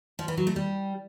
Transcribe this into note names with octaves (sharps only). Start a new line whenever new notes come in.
F3
E3
F#3
A3
G3